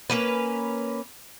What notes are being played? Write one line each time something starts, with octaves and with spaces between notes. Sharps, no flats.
A#3 C#4 B4